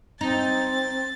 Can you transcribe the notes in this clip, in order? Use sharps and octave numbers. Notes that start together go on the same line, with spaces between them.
C4 D#4 A6